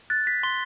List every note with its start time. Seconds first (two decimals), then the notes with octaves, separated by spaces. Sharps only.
0.10 F#6 A6
0.27 B6
0.43 C6 G7